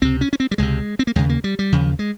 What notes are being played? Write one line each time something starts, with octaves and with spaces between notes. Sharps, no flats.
C#2 C3 C4
C#4
C#4
C4
G3
C#2 C3 G#3
C4
A#3
D#2 C#3 G#3
A#3
G3
G3
D#2 C#3 F3
G#3